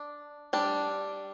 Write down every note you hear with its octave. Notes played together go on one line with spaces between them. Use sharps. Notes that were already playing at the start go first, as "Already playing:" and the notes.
Already playing: D4
G3 D4